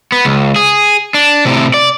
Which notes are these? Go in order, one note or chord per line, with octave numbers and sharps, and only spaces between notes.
B3
C#2
G#4
D4
A2 C3
D5